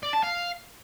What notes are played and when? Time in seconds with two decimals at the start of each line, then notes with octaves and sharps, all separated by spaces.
0.03 D5
0.13 A5
0.23 F5